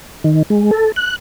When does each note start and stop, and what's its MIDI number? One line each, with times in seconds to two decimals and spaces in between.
0.24 0.43 51
0.50 0.71 56
0.71 0.92 69
0.96 1.16 90